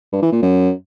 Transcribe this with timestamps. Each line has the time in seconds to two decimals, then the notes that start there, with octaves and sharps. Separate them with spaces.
0.13 G2
0.22 E3
0.32 A#2
0.42 F#2